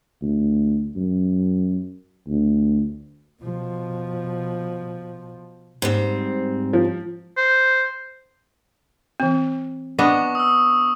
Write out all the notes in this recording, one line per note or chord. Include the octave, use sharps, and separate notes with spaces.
D2
F#2
D2
B2 F3
G#2 G3 C4
F3
C5
E3 C4
B3 D4 D#5 C#6 D6
D#6 E6